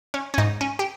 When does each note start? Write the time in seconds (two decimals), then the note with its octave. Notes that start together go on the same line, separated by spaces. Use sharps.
0.14 C#4
0.34 C#4
0.38 G#2 D#4
0.61 C#4
0.79 G4